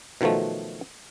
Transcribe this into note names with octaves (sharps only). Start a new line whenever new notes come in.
B2 D#3 F3 F#3 A3